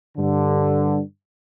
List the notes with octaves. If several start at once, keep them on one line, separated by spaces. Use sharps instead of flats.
G2 D3